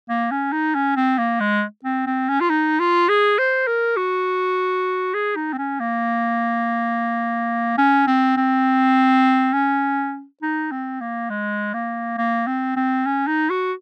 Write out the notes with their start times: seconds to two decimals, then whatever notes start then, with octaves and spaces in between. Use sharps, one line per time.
0.09 A#3
0.31 C#4
0.53 D#4
0.75 C#4
0.96 C4
1.18 A#3
1.40 G#3
1.84 C4
2.06 C4
2.29 C#4
2.40 F4
2.50 D#4
2.80 F4
3.09 G#4
3.39 C5
3.67 A#4
3.97 F#4
5.14 G#4
5.36 D#4
5.53 C4
5.58 C#4
5.80 A#3
7.78 C#4
8.07 C4
8.37 C4
9.53 C#4
10.42 D#4
10.72 C4
11.01 A#3
11.30 G#3
11.74 A#3
12.18 A#3
12.47 C4
12.76 C4
13.06 C#4
13.27 D#4
13.50 F#4